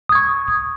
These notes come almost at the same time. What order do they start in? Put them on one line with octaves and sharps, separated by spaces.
D#6 G#6 C#6